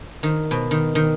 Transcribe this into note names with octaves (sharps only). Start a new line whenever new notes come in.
D#3
B2
D#3
D#3